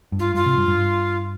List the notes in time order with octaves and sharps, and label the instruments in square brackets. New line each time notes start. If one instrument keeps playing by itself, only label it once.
[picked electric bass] G2
[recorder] F4
[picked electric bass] G2 [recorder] F4
[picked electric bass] C3
G2
G2